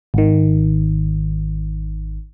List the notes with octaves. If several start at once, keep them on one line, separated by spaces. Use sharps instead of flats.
G#1 D#3